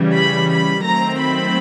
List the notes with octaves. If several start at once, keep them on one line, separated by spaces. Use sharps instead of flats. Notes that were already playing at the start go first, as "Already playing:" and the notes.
Already playing: C#3 E3 G3
B5
B5
D#3 F#3 A3 C4 A#5
B5